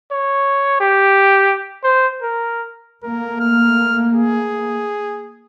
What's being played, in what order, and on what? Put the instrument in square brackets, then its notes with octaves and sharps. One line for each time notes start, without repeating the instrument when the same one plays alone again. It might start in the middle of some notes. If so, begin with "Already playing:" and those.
[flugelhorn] C#5
G4
C5
A#4
[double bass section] A3 A#3 [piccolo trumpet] A#4
[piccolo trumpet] F6
G#4